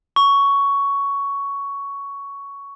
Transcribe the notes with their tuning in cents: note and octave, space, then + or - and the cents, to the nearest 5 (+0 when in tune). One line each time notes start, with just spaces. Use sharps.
C#6 +10